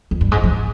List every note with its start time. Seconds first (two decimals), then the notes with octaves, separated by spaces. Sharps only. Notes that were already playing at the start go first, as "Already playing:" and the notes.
0.11 F2
0.21 G2
0.31 G#2
0.43 F3